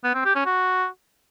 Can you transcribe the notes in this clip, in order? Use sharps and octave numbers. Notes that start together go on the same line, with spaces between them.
B3
C4
G4
C#4
F#4